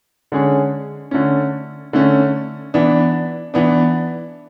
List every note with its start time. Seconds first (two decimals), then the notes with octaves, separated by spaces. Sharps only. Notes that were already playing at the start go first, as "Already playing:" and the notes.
0.32 D3 G#3 C#4 G#4 C#5
1.11 D3 A3 C#4
1.93 D3 A3 C#4
2.74 E3 B3 D4
3.54 E3 B3 D4